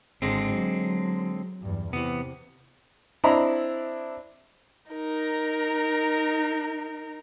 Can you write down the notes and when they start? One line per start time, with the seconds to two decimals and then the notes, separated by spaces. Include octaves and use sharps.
0.22 G#1 D3 G#3 C4
0.50 F#3
1.62 E2 G2
1.93 C3 E3 B3
3.24 C4 D4 E4 D#5 A#5 B5
4.91 D#4 A#4